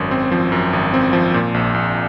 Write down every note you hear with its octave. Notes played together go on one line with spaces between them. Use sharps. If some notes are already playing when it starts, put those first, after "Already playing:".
Already playing: G#1 F#2
C4
F3
F#2
G#1
C4
F3
A#2
A#1
A#1